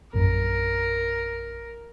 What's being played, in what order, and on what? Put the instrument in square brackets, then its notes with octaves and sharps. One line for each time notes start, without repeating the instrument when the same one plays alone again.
[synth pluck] A#1 F#2 [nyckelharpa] A#4